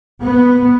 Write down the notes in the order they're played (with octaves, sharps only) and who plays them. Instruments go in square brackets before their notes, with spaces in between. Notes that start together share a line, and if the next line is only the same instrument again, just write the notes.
[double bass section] B3